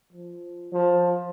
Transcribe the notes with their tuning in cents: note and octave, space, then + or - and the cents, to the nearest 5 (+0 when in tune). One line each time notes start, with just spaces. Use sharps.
F3 -5
F3 +15